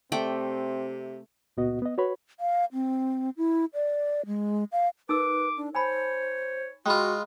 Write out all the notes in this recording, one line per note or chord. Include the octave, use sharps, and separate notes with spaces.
C3 A3 C4 D5 G5
C#2 A#2 B3 F#4 D#5
B3 D#5
F#4 B4 C#5 B5
F5
C4
E4
D5
G#3
F5
D#4 A#4 B4 D6 E6
D4
C5 C#5 G#5 A5 B5
G#3 F4 F#4 G5 B5